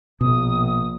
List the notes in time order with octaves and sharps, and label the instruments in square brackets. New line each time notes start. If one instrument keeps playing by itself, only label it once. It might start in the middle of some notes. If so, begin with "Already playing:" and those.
[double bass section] A#1 [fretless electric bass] B2 [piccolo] D#6